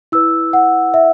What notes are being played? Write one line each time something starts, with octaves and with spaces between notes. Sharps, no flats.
E4 B4 E6
F#5
E5